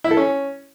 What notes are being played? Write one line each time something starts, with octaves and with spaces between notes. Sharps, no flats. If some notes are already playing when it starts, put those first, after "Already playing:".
E4
A4
C#4